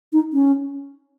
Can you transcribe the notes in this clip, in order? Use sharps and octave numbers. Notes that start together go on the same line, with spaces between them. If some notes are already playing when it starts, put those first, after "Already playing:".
D#4
C#4